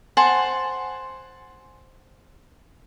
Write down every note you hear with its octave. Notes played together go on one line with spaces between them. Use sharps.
C5 F#5 G#5 A5